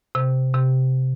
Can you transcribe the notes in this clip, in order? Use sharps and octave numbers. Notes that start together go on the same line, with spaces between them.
C3
C3